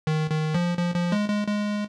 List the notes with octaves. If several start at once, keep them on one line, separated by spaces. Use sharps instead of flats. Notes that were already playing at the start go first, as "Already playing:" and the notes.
D#3
D#3
F3
F3
F3
G#3
G#3
G#3